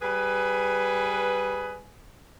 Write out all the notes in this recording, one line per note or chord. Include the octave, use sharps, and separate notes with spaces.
G3 G#4 B4